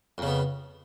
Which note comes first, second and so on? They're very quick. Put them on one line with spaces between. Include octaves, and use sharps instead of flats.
F2 C#3 B3